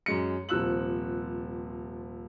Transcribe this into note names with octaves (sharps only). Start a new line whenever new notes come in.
F#2 G#3 C#7
D#1 C3 F3 E6 F#6 F#7